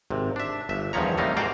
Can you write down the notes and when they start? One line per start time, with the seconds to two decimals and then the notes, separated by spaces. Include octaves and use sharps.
0.10 G#1 C3
0.36 D4 E5
0.69 G1 E5
0.93 E2 G2 D#3 F3 C#5 A#5
1.17 C3 G3 A3 A#3 D#4
1.37 G#2 A#3 F#4 D5 F5 G5